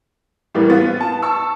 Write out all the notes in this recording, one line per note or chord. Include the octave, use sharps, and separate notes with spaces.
A2 E3 G3 A#3 B3
B3 F4
A5
A5 C#6 E6